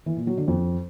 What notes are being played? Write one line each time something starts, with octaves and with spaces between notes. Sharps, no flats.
E3
A#2
F#3
D3
F2